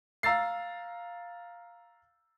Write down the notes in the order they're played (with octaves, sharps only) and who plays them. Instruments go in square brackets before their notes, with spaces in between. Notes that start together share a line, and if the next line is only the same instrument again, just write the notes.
[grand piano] F5 A#5 E6 A6 C7